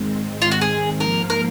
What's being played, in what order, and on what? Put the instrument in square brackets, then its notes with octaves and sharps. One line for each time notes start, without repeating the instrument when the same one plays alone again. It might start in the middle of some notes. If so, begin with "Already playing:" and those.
Already playing: [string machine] G#2 D#3 G#3 C4
[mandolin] F4
F#4
G#4
[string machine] G#2 F3 A#3 F4 [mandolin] A#4
[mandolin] A#4